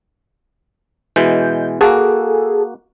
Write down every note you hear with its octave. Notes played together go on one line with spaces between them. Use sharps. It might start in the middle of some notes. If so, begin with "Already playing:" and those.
B2 E3 G#3 G6
A#3 F#4 G#4 A4